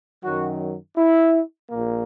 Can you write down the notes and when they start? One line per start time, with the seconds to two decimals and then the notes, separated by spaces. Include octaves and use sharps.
0.24 F#2 D#3 F#3 F#4
0.96 E4
1.70 A#1 A#2 A#3